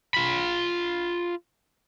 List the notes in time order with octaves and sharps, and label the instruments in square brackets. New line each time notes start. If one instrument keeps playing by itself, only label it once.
[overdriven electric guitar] F4 B5